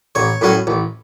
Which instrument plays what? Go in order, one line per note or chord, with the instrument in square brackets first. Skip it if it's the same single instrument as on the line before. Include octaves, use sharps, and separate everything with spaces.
[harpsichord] A1 C#5
A2 F#3 C#4
A1